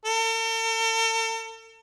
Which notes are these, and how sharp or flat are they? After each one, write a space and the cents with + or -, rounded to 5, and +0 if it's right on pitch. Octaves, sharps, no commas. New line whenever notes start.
A4 +45